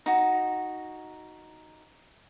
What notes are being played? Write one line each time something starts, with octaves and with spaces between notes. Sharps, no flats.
D#4 F#4